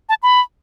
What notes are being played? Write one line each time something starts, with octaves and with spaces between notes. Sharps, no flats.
A5
B5